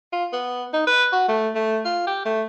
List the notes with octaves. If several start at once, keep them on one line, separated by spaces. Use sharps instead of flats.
F4
B3
D#4
B4
F#4
A3
A3
F4
G4
A3